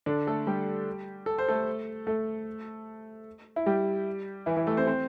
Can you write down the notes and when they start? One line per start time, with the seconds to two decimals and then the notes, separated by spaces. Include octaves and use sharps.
0.06 D3 D4
0.27 A3 A4
0.47 G3 G4
1.26 A4
1.38 C5
1.48 A3 A4
2.07 A3 A4
3.56 E4
3.66 G3 G4
4.46 E3 E4
4.57 E3 E4
4.67 A3 A4
4.77 C4 C5
4.87 C4 C5